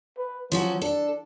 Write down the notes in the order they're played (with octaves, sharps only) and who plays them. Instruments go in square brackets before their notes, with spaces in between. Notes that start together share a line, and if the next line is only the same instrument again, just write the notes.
[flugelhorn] B4
[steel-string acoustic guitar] F3 C#4 F#4 [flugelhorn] F#3
[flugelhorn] D4 [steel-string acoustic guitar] A4